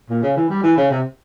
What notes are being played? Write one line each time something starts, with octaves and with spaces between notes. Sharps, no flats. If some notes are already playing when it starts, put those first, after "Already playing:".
A#2
C#3
E3
G3
E3
C#3
C3